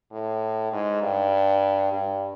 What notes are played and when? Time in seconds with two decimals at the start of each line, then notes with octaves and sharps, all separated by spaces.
0.11 A2
0.72 G#2
1.02 G2
1.92 G2